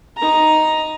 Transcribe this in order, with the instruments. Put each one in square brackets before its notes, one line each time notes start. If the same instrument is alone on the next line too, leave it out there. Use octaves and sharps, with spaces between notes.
[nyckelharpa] D#4 A#5